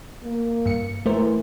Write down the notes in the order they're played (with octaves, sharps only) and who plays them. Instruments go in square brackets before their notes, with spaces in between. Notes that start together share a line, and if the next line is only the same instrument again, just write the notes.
[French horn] A#3
[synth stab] G2 C#7
[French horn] E3 [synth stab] A3 A#4 C5